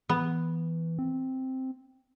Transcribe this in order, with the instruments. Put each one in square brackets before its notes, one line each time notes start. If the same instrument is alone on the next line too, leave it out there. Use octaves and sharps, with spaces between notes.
[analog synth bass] E3 [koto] B3
[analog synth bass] C4